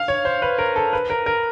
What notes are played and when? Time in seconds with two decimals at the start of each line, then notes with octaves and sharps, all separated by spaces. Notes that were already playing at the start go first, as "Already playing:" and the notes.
Already playing: F5
0.08 C#5
0.25 C5
0.42 B4
0.58 A#4
0.76 A4
0.93 B4
1.10 A#4
1.26 A#4